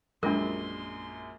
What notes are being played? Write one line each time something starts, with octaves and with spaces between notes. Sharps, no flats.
A#1 F#2 G#3 D4 F4 A#4 C6